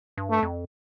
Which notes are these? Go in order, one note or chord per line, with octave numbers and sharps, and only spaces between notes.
G2
A3
F2